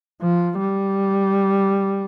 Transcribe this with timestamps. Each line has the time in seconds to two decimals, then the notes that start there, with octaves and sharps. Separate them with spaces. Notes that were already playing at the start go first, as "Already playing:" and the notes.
0.22 F3
0.59 G3